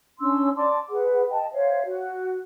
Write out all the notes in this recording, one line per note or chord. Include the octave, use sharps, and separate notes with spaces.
C#4 D4 C6 E6
D5 A5 C6 D6
G#4 B4 F#5
D#5 G5 A5
C5 C#5 E5 F5
F#4